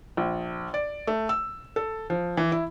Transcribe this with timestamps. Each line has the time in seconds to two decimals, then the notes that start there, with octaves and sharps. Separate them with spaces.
0.17 A#1
0.74 D5
1.07 A3
1.29 E6
1.76 A4
2.10 F3
2.37 E3
2.52 E4